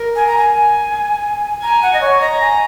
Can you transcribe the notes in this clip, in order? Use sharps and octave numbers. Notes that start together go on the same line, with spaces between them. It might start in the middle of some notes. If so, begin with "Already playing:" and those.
Already playing: A#4
G#5
A#5
G#5
G#5 A#5
F#5
D#5
C#5
D#5 A#5
G#5